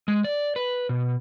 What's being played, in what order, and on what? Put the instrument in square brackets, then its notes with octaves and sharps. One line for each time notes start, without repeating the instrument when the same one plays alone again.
[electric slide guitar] G#3
D5
B4
B2